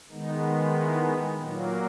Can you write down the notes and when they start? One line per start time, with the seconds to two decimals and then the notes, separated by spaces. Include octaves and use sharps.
0.11 D#3 G#3 B3 D#4
0.76 E4
1.39 A#2 F#3 A#3 D#4